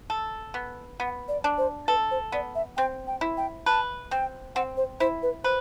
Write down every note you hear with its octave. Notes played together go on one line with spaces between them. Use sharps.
A4
B3
B3 F#5
D5
D4
C5
A4 B4
C5
B3 D5
E5
C4 G5
G5
E4
G5
B4 A5
C4 G5
C4 F#5
C5
E4 C5
B4
B4 C5